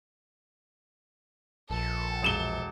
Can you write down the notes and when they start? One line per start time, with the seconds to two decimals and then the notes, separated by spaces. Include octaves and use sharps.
1.70 A#1 A4
2.23 E1 E7 G7